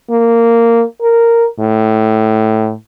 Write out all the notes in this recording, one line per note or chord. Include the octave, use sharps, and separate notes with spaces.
A#3
A#4
A2